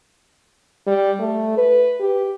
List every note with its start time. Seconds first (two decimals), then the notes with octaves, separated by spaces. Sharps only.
0.87 G3
1.20 A3
1.57 B4
2.00 G4